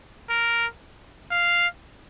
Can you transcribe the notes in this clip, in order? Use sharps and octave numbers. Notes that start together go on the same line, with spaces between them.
A#4
F5